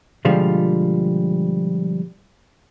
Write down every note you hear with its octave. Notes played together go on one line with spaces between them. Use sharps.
B2 D3 F3 G3 G#3 F4